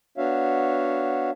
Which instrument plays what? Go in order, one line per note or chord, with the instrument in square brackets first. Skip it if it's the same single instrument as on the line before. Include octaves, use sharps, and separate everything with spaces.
[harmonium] B3 D4 F#4 C#5 E5 F5